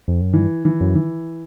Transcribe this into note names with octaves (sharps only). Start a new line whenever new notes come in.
F2
F#2
G2 E3
E3
F#2
E3